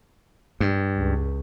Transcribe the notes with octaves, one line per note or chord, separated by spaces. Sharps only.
G2
C#2